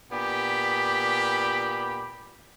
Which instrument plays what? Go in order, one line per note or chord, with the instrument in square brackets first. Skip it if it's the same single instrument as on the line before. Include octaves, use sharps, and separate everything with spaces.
[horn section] A#2 B3 D4 G4 B5